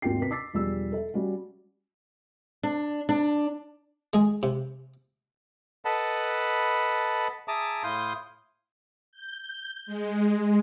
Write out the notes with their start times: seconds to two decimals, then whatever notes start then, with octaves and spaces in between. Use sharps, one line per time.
0.02 G#1 D#2 F4 F#4 G5 C7
0.19 C3 A#4 B4 B6
0.31 D6 E6 A6 B6 C7
0.53 E1 F3 G3 G#4 E6
0.92 A4 E5
1.14 G3 C#4 F#4
2.63 D4
3.09 D4
4.13 G#3 G#4
4.43 C3
5.85 A4 B4 D#5 F#5 A5 B5
7.48 G#4 E5 A5 A#5 D6 D#6
7.84 A2 E4 F5 C6 D#6 G6
9.12 G6
9.86 G#3